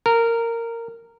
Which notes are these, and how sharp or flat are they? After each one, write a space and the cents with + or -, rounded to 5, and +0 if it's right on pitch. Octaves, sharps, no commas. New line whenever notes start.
A#4 -15